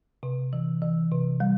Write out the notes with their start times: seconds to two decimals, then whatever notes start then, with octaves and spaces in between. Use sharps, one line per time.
0.23 C3
0.53 E3
0.82 E3
1.12 C3
1.40 G3